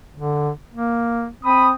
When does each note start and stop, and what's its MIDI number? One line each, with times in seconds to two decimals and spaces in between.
0.16 0.51 50
0.74 1.29 58
1.44 1.75 60
1.44 1.68 83
1.44 1.68 87